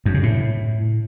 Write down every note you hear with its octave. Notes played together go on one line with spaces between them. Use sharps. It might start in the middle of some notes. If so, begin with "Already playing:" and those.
F#2
C#3
A2